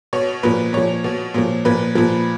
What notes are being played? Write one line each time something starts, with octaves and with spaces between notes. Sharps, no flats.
B2 C#5
A#2 F3 B4
A#2 F3 C#5
B2
A#2 F3
A#2 F3 B4
A#2 F3